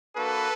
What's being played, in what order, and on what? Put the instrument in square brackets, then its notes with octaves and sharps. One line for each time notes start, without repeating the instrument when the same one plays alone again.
[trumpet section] A#3 D4 F#4 A4 B4